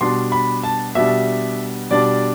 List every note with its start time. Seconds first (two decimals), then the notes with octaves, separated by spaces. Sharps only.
0.01 B2 G3 D4 C6
0.32 B5
0.63 A5
0.95 B2 G3 D4 E5
1.91 B2 G3 D4 D5